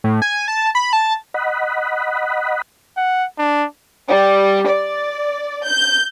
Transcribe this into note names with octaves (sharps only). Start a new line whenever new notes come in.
A2
G#5
A5
B5
A5
D#5 F#5 B5
F#5
D4
G3
D5
G6